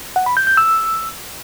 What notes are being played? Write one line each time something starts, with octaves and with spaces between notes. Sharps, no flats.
F#5
B5
G6
G6
E6